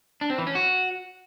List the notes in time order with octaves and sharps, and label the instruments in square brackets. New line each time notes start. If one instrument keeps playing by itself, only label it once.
[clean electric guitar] D4
C4
E3
C#4
F#4